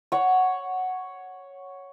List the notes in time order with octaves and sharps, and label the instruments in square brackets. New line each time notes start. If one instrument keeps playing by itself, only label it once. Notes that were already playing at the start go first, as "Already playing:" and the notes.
[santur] C#5 F#5